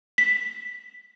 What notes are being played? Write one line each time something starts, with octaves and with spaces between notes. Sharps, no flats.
B6